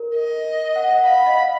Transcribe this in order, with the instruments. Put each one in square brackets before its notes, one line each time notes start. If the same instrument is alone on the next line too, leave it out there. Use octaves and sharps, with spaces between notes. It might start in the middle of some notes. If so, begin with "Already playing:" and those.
Already playing: [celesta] A#4
[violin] D#5
[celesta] F#5
F#5
[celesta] F5 [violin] B5
[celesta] D#5
F5